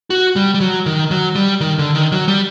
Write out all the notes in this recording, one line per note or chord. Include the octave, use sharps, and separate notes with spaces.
F#4
G3
G3
F#3
D#3
F#3
G3
D#3
D3
D#3
F#3
G3